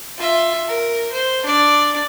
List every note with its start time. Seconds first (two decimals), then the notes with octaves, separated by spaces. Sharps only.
0.18 F4 E5
0.68 A#4
1.12 C5
1.45 D4 D5